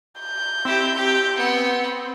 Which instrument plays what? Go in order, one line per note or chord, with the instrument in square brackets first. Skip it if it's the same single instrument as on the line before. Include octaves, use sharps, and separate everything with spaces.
[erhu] G6
[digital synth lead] C4 [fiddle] E4 G4
[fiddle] G4
B3 F#5